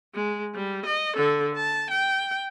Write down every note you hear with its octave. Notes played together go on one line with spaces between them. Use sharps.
G#3
G3
D#5
D3 A4
A5
G5